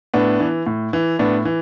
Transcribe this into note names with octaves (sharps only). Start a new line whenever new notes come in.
A2 B3 D4
E3
A2
E3
A2 B3 D4
E3